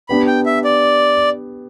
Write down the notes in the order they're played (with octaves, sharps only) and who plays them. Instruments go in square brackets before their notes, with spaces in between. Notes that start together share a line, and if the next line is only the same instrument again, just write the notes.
[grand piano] B3 D4 G4 B4 [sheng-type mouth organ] B5
[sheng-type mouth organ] G5
E5
D5